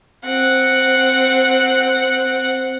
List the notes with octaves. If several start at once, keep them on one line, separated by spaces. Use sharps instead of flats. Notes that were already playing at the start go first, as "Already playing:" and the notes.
C4 F#5